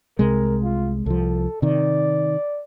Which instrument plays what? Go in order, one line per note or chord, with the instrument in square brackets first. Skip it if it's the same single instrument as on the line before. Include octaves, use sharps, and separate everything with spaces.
[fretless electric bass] C2 C3 G#3 [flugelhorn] A#4
[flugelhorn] F4
[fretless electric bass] C2 F3 [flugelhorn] A4
[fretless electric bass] C3 D#3 [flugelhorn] D5